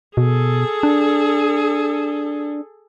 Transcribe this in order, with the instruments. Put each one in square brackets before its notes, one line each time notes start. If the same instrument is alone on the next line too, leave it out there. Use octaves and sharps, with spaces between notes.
[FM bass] B2 [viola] G#4 A4
[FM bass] D4